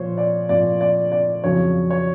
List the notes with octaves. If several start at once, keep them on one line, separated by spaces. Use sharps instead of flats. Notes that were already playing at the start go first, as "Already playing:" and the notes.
Already playing: A#2 F3 C5 C#5
D5
A#2 F3 D5
D5
D5
F2 C#3 F#3 C#5
C#5